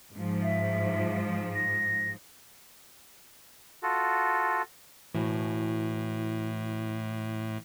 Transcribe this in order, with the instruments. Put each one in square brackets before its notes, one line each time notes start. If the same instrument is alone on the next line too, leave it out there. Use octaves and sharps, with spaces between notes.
[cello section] G#2 F3
[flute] E5
A#6
[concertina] F4 F#4 A4
[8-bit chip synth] A2 [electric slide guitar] E3 E4 F#4